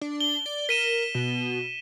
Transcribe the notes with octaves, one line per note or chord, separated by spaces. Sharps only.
D4
G7
D5
A#4 B6 D#7 E7
B2